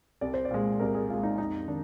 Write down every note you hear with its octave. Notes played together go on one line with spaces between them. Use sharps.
C2 D5
C5
D5
A#2 G#3
C2 A#4
G#4
A#2 G#3 F4
D#4
F2 D#4
D#3 D4